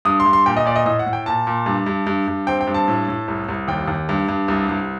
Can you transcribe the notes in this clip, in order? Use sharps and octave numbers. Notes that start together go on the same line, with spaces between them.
G2 D#6
C6
G2
C6
A#2 G5
D#5
A#2 D5
D#5
A2 D#5
F#5
A2
G5
A#2 A5
A#2
G2
G2
G2
G2
C4 G5
G5
G2
A5
A2
A2
C2
C2
D#2 G5
D#2
G2
G2
C2
C2